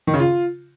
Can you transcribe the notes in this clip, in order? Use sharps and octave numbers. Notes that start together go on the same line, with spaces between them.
D#3
C#3
F4